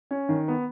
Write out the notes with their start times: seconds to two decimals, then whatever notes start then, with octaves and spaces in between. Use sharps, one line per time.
0.11 C#4
0.29 D#3
0.48 B3